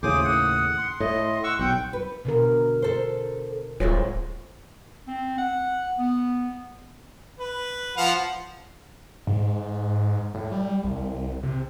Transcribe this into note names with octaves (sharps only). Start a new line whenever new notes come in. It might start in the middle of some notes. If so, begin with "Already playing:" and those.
D#2 A2 C#3 G#4 C5 D6 D#6
F#5
C6
A2 D#5
F#5 C#6 E6
B1 F#5 G5
B4
B2 D3 A#4
A4 C5
D1 G#3 A3 F4 G#4 C5 C#5
C4
F#5
B3
B4
F3 F5 F#5
G#2
A2
G3
C2
C3